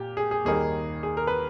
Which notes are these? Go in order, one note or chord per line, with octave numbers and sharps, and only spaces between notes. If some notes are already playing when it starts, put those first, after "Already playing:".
Already playing: A#2 G4
G#4
G#4
D#2 D#3 G3 A#3 D#4 G#4
G#4
A#4
B4